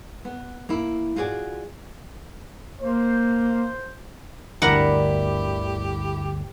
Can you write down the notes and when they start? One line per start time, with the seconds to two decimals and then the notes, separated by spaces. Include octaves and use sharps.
0.25 B3
0.69 A#3 E4
1.16 F4 F#4 G#4 C#5 D5
2.81 A#3 C5
4.62 G1 D2 A2 E4 G4 A#4 D5 F#5